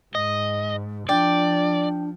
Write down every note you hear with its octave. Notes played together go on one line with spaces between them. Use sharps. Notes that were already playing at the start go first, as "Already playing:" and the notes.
G#2 D#5
F3 D4 D5 G5